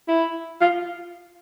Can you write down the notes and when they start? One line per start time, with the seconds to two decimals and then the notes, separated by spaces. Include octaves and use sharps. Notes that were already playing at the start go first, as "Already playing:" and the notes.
0.08 E4
0.61 F4